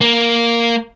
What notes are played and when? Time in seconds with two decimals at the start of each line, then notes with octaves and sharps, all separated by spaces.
0.01 A#3